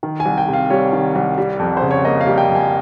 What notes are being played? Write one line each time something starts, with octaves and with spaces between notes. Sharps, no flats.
D#3
G#5
C2
G5
C3
F5
G3 C#5
D#3
C2
G3
F2
C5
C#3
C#5
A#3 D#5
F5
G3
G5
F2
G#5